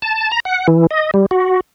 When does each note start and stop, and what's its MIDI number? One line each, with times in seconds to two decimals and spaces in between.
0.02 0.32 81
0.32 0.40 82
0.45 0.67 78
0.68 0.87 52
0.91 1.11 75
1.14 1.26 55
1.31 1.60 66